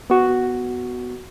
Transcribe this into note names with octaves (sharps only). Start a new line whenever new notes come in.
B3 F#4